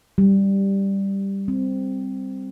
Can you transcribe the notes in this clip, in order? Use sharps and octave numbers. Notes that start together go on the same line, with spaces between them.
G3
C4